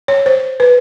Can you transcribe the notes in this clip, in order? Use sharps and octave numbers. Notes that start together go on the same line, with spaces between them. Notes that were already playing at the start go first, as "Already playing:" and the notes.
C#5
C5
B4